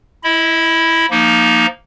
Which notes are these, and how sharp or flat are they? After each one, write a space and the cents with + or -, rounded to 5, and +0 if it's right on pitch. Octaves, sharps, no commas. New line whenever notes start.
E4 +0 D#5 +40 B5 +0
F3 +0 A#3 +0 D#4 +0